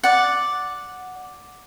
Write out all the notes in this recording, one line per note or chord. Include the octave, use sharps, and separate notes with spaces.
D5 F#5